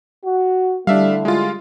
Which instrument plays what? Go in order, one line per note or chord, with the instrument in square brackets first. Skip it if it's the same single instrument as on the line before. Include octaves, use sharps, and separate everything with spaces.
[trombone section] F#4
[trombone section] D3 A3 E4 [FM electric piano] G3 [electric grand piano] D4 E5 F5
[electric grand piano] G#3 F4